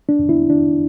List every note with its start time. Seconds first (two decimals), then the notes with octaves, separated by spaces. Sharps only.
0.09 D4
0.29 E4
0.50 D4